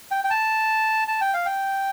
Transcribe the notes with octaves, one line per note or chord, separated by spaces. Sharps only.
G5
G5
A5
A5
G5
F5
G5